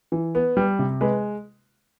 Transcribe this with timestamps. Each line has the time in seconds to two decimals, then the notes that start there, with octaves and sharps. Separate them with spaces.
0.12 E3
0.35 B3
0.57 G3
0.79 C3
1.01 G#3 B4